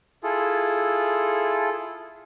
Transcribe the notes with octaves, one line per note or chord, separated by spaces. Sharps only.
E4 F4 G#4 A4